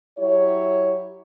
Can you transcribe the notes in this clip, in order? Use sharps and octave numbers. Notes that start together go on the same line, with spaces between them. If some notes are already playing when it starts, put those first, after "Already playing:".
F#3 E4 G4 C#5